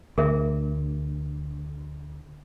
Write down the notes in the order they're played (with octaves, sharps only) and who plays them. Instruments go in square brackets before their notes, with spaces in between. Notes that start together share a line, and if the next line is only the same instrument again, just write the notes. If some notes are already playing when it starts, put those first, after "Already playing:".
[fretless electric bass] D2 [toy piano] G#4 A#4 E5